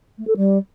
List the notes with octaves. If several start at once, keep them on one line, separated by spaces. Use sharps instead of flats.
A3
A4
G3